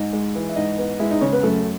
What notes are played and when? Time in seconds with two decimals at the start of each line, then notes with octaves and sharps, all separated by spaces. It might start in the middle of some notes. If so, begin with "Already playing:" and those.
Already playing: G#2 D#4 D#5
0.13 G#3
0.35 E3
0.49 E5
0.56 G#2 D#4 D#5
0.78 B3
0.99 G#3 E4 E5
1.11 D#4 D#5
1.21 C#3 C#4 C#5
1.32 B3 B4
1.43 F#2 A3 A4